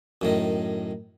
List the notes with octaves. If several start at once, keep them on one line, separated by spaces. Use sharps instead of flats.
F#2 A2 D#3